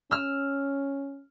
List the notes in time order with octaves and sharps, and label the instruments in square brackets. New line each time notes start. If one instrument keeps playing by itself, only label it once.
[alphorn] C#4 [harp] E6 F6